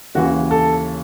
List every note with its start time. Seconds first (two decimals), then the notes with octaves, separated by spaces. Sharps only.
0.15 D#2 C#3 E3 F#4
0.51 A4